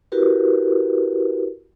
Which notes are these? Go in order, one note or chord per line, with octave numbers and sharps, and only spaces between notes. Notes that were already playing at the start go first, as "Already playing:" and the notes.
E4 F#4 G4 A#4 B4